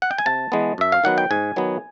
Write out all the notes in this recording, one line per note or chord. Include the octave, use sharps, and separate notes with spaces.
F#5
G5
G#5
C3 A5
E3 G#3 B3
F#2 E5
F5
D#3 F#3 B3 F#5
G5
G#2 G#5
D#3 F#3 B3